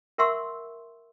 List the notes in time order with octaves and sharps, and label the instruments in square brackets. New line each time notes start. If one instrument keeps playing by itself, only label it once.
[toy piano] A#4 E5 F#5 C6 C#6 E6